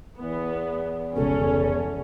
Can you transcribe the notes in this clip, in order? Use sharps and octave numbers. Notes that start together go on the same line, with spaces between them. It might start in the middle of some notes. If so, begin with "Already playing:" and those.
E2 B3
F1 C#2 B2 C#4 A4